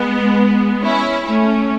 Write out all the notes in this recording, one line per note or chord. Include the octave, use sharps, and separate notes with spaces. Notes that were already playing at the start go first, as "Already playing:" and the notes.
Already playing: G#3 B3
C#4 E4
A3 C#4